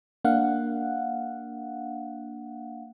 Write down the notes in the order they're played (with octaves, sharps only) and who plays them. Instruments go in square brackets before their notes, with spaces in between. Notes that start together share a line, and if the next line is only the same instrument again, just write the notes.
[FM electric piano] A#3 D4 F5 F#5